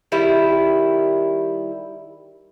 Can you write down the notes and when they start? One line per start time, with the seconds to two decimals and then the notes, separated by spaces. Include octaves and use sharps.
0.12 D#3 G3 E4